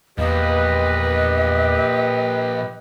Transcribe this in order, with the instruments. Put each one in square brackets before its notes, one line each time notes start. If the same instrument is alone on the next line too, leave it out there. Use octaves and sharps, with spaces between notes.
[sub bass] E2 [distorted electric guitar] A#2 F3 [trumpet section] G4 B4 [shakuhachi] D#5